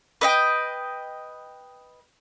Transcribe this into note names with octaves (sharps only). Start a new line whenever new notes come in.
B4 D#5 G5